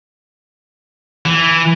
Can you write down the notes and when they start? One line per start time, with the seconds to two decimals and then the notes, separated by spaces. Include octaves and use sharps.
1.25 E3